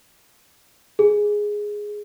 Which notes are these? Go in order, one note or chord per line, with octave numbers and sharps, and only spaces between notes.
G#4